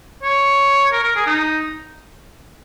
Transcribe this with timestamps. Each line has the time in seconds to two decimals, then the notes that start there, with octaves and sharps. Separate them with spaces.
0.23 C#5
0.92 A#4
1.04 A#4
1.16 G#4
1.27 D#4